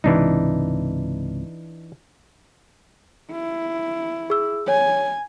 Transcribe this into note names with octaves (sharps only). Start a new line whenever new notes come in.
C#2 G#2 C3 E3 D4 D#4
E4
G#4 E6
C#5 G#5